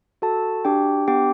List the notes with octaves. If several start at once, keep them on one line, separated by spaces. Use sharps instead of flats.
F#4 A4 A5
D4 G4 G5
B3 G4 G5